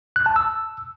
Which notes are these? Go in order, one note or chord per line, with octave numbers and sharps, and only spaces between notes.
F#6
A5
E6